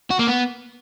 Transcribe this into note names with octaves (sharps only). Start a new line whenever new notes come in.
F#4
A#3
B3